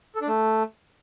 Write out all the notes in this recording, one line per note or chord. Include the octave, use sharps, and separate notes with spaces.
A4
D4
A3